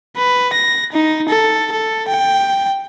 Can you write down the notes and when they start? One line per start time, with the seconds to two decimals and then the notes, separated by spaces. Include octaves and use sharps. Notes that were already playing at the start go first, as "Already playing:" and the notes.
0.17 B4
0.53 A#6
0.93 D#4
1.29 A4
1.72 A4
2.08 G5